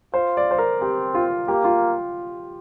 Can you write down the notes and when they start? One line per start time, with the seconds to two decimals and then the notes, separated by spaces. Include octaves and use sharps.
0.14 F4 C5
0.37 D5
0.51 C5
0.58 A#4
0.81 C4 G4
1.15 F4
1.48 A#3 G4
1.64 F4